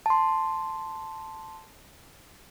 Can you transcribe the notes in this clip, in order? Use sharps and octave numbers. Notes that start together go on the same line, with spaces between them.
A5 C6